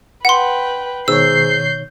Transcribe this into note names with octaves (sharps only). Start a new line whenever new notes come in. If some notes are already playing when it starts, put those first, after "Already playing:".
B4 F#5 G5 C6
G#2 B2 D#3 C#5 E6 G6 C7